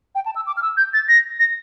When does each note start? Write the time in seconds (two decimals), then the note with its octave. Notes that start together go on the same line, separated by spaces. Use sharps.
0.15 G5
0.26 A5
0.36 E6
0.47 D6
0.57 F6
0.62 E6
0.77 G6
0.94 A6
1.09 A#6
1.40 A#6